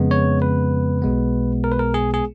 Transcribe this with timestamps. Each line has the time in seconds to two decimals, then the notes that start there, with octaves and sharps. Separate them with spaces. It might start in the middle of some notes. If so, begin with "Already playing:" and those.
Already playing: F2 C#3 G#3 B3
0.11 C#5
0.42 B4
1.02 B1 B2 G#3 B3
1.64 A#4
1.72 B4
1.79 A#4
1.94 G#4
2.14 G#4